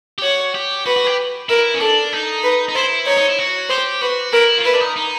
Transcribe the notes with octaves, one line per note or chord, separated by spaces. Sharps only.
G4
F#4 C#5
G4
F#4 B4
F#4
G4
E4 A#4
C#4
D4 A4
D#4
B4
D#4
E4 C5
D#4 C#5
D#4
E4
F#4
G4 C5
F#4 B4
E4 A#4
F4
E4 B4
D4
D#4
D#4